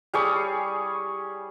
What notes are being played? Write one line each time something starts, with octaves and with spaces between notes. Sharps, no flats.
G3 G#4 C#5